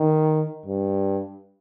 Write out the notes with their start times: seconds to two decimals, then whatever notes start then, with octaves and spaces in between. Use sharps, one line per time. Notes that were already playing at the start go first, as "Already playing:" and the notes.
Already playing: D#3
0.66 G2